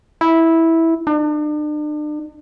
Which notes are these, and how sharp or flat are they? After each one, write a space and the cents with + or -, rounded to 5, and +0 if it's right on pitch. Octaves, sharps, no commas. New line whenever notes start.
E4 -10
D4 +40